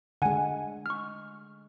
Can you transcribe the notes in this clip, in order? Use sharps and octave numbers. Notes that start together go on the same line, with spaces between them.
D3 G#3 F#5 G#5
C#6 F6